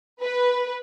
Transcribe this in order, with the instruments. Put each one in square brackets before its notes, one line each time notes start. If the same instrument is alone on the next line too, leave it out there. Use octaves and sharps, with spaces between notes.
[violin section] B4